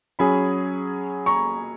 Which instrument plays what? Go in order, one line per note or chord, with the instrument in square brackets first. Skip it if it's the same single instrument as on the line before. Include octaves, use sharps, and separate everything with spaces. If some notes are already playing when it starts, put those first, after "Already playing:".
[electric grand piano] F#3 C#4 G#4 [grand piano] G#5 B5
[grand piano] A#5 C#6